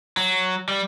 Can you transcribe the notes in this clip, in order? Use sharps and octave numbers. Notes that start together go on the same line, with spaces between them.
F#3
G3